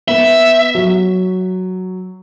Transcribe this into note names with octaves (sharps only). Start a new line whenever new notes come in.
B3 E5
F#3